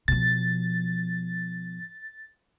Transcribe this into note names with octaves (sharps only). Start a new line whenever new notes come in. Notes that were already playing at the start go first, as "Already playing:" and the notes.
B2 F3 A6